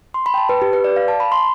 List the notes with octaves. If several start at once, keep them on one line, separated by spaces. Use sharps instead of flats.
C6
B5
G5
A5
B4
G4
B4
D5
F5
A5
B5
C6